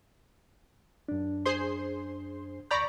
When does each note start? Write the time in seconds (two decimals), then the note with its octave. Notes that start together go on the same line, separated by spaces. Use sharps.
1.08 F#2 D4
1.46 G#4 C5 C6
2.71 D2 D5 A#5 B5 C#6 G6